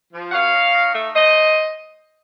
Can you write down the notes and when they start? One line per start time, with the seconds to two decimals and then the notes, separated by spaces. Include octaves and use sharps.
0.13 F3
0.29 F#5
0.33 F#2 C#5 F5
0.53 D#4
0.74 D#4
0.94 A3
1.15 A3 C5 D#5